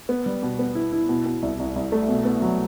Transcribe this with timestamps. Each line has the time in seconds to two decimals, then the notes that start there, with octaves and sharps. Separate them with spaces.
0.09 B3
0.26 G3
0.43 B2
0.59 B3
0.75 E4
0.93 E4
1.09 B2
1.26 B2
1.42 C2
1.59 C2
1.76 C2
1.92 A3
2.09 B2
2.25 B3
2.42 F#3